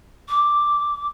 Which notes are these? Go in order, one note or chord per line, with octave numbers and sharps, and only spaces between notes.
D6